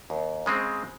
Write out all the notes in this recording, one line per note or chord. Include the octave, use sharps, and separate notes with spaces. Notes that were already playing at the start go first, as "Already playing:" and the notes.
D#2
C#3 G#3 C4